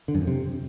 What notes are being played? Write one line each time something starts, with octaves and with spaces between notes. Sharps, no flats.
D3
F#2
F2
C3